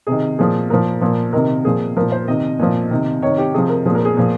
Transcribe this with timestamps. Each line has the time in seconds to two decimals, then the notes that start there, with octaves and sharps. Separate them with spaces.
0.07 C3 D#3 G#4
0.39 A#2 F3 G#4
0.70 A#2 F3 A#4
1.01 A#2 F3
1.33 C3 D#3 A#4
1.65 A#2 F3 G#4
1.97 A#2 F3 A#4
2.12 C5
2.28 C3 D#3 D#5
2.59 A#2 F3
2.90 C3 D#3
3.22 C3 D#3 C#5
3.38 G4
3.54 C3 F3 G#4
3.69 A#4
3.86 A#2 F3 G#4
3.95 A#4
4.05 G#4
4.17 A#2 F3